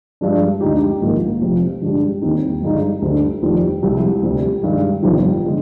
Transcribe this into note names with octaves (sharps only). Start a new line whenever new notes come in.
G2 F3 G#3 D4
D2 D3 G#3 D#4 G4
A#1 G#2 D#3 A#3 F4
F1 F2 C3 F3
G2 D3 G#3 D4 G4
D#2 D#3 G3 C4 D#4
G#1 G2 D3 G#3 D#4
D2 D3 G3
F1 F2 D#3 G3
C2 C3 F3 G#3
D2 C3 G3
G2 D#3 G#3
G1 F2 C3 D#3
D3 G#3